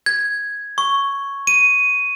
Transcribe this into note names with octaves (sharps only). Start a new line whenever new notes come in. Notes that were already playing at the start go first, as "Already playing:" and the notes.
G#6
C#6
D#7